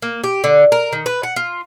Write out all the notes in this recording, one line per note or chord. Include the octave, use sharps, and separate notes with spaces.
A#3
G4
D3
A#4
D#3
B4
F#5
F4